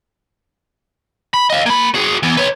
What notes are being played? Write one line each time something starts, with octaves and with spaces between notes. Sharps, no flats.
B5
D#5 F5
A#3 B5
F#4 G#4
E3 B3
B4 C#5